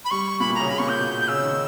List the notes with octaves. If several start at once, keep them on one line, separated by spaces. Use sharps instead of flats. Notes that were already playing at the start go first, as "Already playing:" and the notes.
B5
G3 C#6
A#2 B5
B2
C#3 A#5
C#3 B5
A#2 C#6
A#2 G6
B2
G6
C#3 E6
D#3